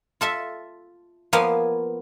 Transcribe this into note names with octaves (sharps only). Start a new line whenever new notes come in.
F4 A4 E5
F3 A#3 B3 F5 G#5